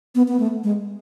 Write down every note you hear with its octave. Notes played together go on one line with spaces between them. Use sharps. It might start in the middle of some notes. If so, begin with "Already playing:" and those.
B3
B3
A3
G#3